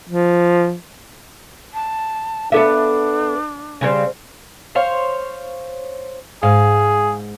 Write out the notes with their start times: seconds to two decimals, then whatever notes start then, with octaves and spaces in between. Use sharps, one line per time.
0.10 F3
1.74 A5
2.52 B3 D4 A4 E5
3.81 C#3 G3 C4
4.75 C5 C#5 F5
6.43 G#2 G#4 F5